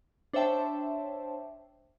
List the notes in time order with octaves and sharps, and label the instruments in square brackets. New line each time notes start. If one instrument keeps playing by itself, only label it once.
[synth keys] D4 C5 C#5 E5 G5 A5